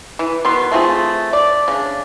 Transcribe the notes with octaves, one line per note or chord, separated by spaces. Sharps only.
E3
B2 D#3 B3 C6
A3 C4 F4 G#4
D5
C#3 D4